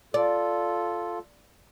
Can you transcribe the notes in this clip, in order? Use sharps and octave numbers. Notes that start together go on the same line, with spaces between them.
F4 A4 D5